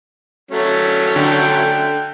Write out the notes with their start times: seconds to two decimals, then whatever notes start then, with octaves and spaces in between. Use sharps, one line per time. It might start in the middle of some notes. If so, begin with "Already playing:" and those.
0.51 F#3 A3 C#4
1.16 D3 G5